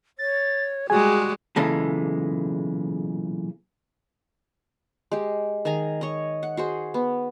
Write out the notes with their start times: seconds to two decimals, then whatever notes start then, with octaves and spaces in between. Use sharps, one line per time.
0.19 C#5 A6
0.90 G3 G#3 F#4 G#4 G#5
1.56 B1 A#2 C#3 E3 G#3 A4
5.12 G#3 G4
5.65 D#3 G#4 G#5 A#5
6.01 C#5 D#5
6.43 F#5
6.57 F#4 G#4 C5
6.94 B3